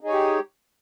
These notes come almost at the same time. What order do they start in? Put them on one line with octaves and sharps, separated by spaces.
D#4 G#4 C#5 G4